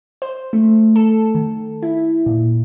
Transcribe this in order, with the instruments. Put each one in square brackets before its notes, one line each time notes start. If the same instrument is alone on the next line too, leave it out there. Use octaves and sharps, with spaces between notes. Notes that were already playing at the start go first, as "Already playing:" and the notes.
[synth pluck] C5
A3
A4
D#3
E4
A#2